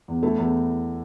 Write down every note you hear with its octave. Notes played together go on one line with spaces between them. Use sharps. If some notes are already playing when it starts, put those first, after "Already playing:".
E2
A3 E4 A4
E2 A4